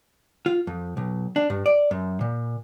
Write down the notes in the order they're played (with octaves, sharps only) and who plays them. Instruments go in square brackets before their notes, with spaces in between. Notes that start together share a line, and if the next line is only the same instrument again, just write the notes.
[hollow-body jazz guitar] F4
F2
B1
D4
G2
D5
F#2
A#2